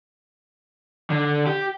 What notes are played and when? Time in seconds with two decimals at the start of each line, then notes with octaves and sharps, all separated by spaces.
1.10 D3
1.47 G4